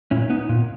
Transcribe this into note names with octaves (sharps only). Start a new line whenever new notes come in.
A#2 C#4 E4
B3 D#4
A#2